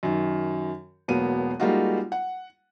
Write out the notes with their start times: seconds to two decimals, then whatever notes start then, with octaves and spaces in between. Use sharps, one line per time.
0.03 F#2 D#3
1.08 E1 F#3 A#3 B3 D#7
1.60 G3 G#3 A#3 D#4 F4 F#4
2.12 F#5